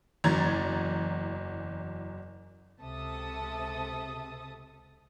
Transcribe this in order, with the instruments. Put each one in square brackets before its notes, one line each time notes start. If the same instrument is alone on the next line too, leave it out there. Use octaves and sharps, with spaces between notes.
[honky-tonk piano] F#1 E2 F#3 A#5 G#6 A6
[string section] C#2 C3 A4 E5 A5 D#6